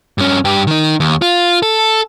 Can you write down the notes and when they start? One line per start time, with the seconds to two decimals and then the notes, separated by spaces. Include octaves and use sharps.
0.18 G2 C#4
0.45 G2 G4
0.67 D#3 D#4
1.00 D#2
1.22 F4
1.63 A4